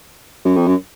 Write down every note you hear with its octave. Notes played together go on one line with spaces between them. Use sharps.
F#2
F2
F#2